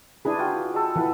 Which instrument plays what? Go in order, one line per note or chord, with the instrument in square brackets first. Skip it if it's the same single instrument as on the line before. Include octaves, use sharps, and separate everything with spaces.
[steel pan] D4 E4 G#4 [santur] B4 G#5
[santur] F4 F#4 G5
G#3 A4
[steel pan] E3 [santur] B4 F#5